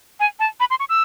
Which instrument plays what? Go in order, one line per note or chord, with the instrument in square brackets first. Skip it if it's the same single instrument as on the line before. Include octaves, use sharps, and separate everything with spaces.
[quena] G#5
A5
B5
C6
C#6
E6